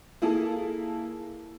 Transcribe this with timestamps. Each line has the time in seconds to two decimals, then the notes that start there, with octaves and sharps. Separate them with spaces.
0.22 A#3 E4 G#4 A4